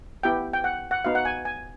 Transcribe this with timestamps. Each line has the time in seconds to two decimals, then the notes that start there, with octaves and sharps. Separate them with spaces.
0.23 B3 E4 G4 G5
0.53 G5
0.64 F#5
0.91 F#5
1.05 B3 D#4 F#4 F5
1.15 F#5
1.25 G#5
1.45 G#5